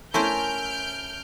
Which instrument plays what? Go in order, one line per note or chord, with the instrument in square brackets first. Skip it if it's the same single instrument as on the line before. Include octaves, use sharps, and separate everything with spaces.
[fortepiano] A3 E4 [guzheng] C#4 A#4 C5 [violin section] F6 G6 D7